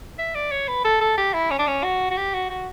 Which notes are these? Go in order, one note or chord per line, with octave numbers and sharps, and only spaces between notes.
E5
D5
C#5
B4
A4
A4
G4
E4
C#4
D4
C#4
F#4
F#4
G4
F#4
F#4